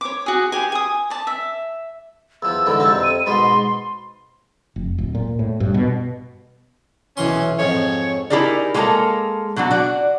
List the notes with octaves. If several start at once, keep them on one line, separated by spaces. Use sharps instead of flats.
C#5 D6
F#4 G#4
G4 G#4 G#5
G#5 D#6
D5 A5
E5
E2 F3 E6
G#2 D3 E3
F2 C3 C4
D#7
G#2 B2 G#3 C6
F1
D1
A#2
A2
G2
B2
B1 E3 C#4 C6
F2 G#2 C#5
D#4 E4 G4 G#4 A#4 D5
G#3 A#3 G4 A4 A#4 C#5
B2 F#3 D4 F#4
F#4 D5